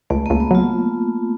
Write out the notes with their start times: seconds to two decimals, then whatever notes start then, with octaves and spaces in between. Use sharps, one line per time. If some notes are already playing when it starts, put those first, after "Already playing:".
0.10 C#2 A3
0.26 A#3
0.30 C#2
0.40 B3
0.51 F#3 F4